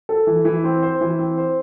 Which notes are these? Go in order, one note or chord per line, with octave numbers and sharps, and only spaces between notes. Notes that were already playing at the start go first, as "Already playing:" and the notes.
A4
E3
E3
C4
C5
E3
C4
C5